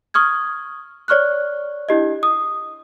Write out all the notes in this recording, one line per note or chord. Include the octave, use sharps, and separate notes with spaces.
C#6 D#6 F6 G#6
C#5 D5 C#6 F6 F#6
D4 E4 G4 D#5
D#6